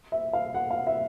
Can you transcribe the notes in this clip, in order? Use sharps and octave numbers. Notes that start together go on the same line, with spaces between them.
E5
F5
F#5
F5
E5